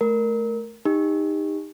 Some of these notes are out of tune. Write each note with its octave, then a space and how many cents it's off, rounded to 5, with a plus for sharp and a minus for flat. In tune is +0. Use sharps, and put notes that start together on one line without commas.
A3 -10 A#4 +0
D#4 +0 G4 +35